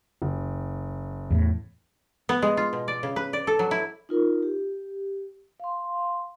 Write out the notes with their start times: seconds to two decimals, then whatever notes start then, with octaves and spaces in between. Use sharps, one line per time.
0.22 F#1
1.30 E2 A2
2.29 B3
2.42 G#3
2.57 F4
2.73 B2
2.88 D5
3.03 C#3
3.16 B4
3.33 D5
3.47 A4
3.59 F#3
3.71 E4
4.09 D#4 F4 A#4
4.43 G4
5.60 F5 C6